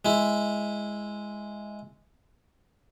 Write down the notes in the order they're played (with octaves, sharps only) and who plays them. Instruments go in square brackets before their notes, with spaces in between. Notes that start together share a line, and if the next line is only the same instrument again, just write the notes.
[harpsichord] G#3 E4